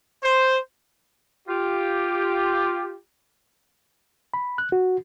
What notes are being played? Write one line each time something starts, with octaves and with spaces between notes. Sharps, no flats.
C5
F4 G4
B5
F#6
F#4